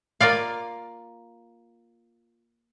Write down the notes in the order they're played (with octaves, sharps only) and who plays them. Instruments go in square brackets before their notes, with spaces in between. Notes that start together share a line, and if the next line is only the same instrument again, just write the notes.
[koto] A#3 F4 D5 F5